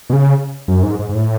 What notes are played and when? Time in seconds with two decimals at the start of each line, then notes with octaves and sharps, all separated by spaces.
0.10 B2
0.13 C#3
0.68 F#2
0.83 G#2
0.99 G#2
1.09 G#2
1.15 A2